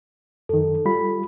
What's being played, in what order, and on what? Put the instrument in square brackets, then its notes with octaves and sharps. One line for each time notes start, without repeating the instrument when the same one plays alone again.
[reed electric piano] F#2 D#3 [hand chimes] A4
[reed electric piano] G3 F4 B5